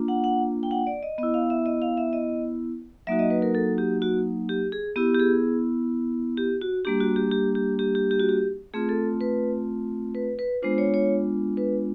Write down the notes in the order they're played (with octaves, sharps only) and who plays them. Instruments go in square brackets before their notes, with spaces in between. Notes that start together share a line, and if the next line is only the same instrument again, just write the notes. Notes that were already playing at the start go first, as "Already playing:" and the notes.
Already playing: [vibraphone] A#3 D4 F4
F#5
F#5
G5
F#5
D5
D#5
B3 D#5
E4
F5
E5
D#5
F5
E5
D#5
F#3 A#3 D#4 F#4 E5
D#5
B4
A#4
A4
G4
F#4
G4
G#4
B3 E4 G4
G4
G#4
G4
F#4
G3 A#3 D4 G4
F#4
G4
G4
G4
G4
G4
G4
F#4
G4
A3 C4 F4 G#4
A4
B4
B4
B4
G#3 B3 D4 F4 C5
C#5
C#5
B4